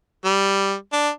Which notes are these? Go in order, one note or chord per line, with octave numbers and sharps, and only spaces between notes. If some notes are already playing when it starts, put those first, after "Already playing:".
G3
D4